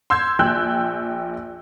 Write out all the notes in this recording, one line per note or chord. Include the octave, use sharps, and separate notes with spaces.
C6 E6 G6 G#6
A#1 G5 E6 F#6 G6